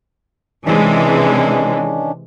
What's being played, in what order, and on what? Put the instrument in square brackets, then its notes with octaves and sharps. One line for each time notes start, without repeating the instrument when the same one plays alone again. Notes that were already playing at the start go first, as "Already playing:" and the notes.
[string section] C3 E3 G#3 [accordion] D#3 C#4 D4